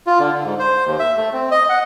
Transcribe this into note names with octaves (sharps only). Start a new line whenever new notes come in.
F4
D3
D3
G#2
C5
D#2
E5
A3
C4
D#5
F#5